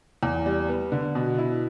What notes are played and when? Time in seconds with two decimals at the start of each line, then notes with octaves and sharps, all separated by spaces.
0.23 E2
0.46 G3
0.69 B3
0.92 D3
1.15 B2
1.38 E4